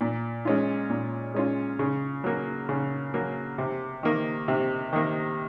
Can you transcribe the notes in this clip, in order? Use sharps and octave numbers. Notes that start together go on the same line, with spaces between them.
A#2
G#3 C#4 F4
A#2
G#3 C#4 F4
C#3
F#3 A#3
C#3
F#3 A#3
C3
D#3 A#3
C3
D#3 A#3